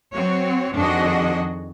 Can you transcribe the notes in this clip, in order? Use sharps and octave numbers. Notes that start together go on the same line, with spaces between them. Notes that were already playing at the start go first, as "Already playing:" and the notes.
F#3 C4 F#4 C#5
F2 D#3 D4 F#4 G#4 D#5